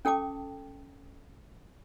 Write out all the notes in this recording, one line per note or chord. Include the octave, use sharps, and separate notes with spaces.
C#4 A4 G5 A5 D6